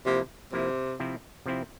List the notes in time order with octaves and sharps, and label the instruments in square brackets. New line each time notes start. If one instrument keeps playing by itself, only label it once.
[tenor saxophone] C3 [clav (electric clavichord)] F3 A#3 E4
[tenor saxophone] C3 [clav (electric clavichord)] F3 A#3 E4
[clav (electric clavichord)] C3 F3 C4 E4
C3 F3 C4 E4